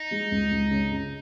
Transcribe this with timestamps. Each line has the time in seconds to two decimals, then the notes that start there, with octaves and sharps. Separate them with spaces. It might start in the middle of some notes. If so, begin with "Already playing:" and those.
Already playing: D#4
0.11 G#3
0.32 C#2
0.52 C#2
0.71 C#3
0.92 C#3